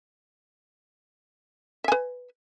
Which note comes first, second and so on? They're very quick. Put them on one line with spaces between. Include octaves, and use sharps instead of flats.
E5 G#5 B4